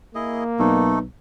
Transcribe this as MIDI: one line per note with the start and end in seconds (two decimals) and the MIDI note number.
0.15 1.00 58
0.15 0.44 64
0.15 0.44 68
0.15 0.44 75
0.59 1.03 35
0.59 0.99 57
0.59 0.99 63
0.59 0.99 69